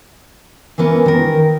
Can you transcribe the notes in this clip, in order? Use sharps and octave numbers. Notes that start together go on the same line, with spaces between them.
E3 A#3 B3 C#4
D#3 A#4